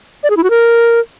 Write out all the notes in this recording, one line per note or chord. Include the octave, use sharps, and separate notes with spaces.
D5
G#4
E4
F#4
A#4